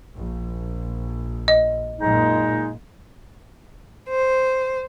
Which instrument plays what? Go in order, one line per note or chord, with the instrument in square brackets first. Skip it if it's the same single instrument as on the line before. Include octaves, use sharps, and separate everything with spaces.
[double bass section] A#1
[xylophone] D#5
[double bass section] F#2 A#2 [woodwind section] G#3 D#4
[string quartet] C5